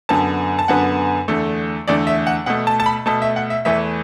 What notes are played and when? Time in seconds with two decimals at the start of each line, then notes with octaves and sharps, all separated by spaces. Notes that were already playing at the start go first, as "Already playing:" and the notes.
0.09 F#2 D3 B3 A5
0.59 A5
0.68 F#2 D3 B3 F#5
1.28 E2 D3 A3
1.88 E2 D3 A3 D5
2.07 E5
2.27 F#5
2.46 B2 A3 F#5
2.67 A5
2.80 A5
2.86 B5
3.06 B2 A3 A5
3.22 E5
3.36 F#5
3.50 E5
3.65 E2 E3 A3 E5